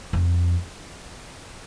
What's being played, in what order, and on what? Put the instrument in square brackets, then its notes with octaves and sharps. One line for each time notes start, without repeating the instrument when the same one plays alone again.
[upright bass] F2